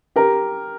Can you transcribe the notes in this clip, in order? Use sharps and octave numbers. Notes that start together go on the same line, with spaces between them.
G4 A#4